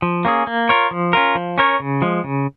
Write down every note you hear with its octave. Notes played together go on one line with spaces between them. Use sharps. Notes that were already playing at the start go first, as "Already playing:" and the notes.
F3
A#3 C#4 G#4
A#3
F4 A#4 C#5
F3
C#4 F4 A#4
F3
C#4 A#4 C#5
C#3
F3 G#3
C#3